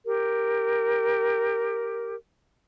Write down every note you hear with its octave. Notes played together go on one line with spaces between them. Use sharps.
G4 A#4